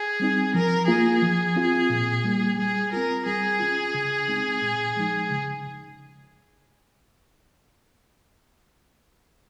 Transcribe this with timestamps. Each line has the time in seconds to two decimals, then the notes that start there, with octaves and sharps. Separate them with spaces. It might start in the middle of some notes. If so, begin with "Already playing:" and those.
Already playing: G#4
0.20 G3 C4 D#4
0.54 F3 A#4
0.88 A#3 F4 G#4
1.22 F3
1.56 C4 F4
1.90 A#2
2.24 G3 A#3
2.58 G3 G#4
2.92 C4 F4 A#4
3.26 G3 G#4
3.60 C#4 F4
3.94 C#3
4.28 G#3 C4 D#4
4.62 A#2
4.96 F3 G#3 D#4
5.30 C#3